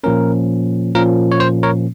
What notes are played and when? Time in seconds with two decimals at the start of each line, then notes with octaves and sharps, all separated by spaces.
0.04 A#2 F3 A#3 C#4 A#4
0.95 A#2 F3 A#3 C#4 A#4
1.32 C#5
1.40 C5
1.63 A#4 C#5